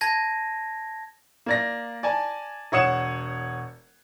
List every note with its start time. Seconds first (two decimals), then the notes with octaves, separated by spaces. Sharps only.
0.01 A5 G#6 A#6
1.46 A#3 D5 A#6
2.03 D5 G#5 A5
2.72 E1 C#5 F#5 D#6 C#7 E7